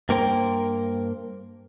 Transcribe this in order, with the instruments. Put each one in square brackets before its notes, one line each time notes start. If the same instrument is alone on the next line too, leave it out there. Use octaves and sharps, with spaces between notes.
[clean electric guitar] G2 A#3 A#4 C5 G5